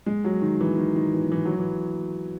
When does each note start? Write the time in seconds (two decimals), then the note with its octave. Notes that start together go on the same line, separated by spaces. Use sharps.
0.06 G#3
0.24 F#3
0.42 D#3
0.61 E3
0.78 D#3
0.96 D#3
1.14 E3
1.32 E3
1.45 F#3
1.59 E3